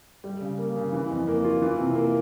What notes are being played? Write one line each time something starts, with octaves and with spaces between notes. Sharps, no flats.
G3
C#3
A#3
C#3
E3
F2
A#3
F4
E3
C3
A#3